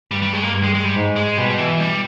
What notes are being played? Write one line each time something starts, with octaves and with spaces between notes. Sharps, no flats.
G2 G3
G3
G#3
A#3
G2
G#3
G#3
G3
G#2
G#3
B2 G3
E3
G3